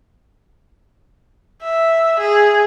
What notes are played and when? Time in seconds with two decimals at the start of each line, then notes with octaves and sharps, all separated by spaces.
1.62 E5
2.19 G#4